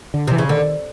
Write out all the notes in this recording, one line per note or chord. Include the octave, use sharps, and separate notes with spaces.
D3
C3 E3
C#3
D3 D#3